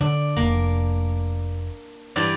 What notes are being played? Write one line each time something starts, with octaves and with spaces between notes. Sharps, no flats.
D3 D4
F1 D#3 A#3
G2 E3 D5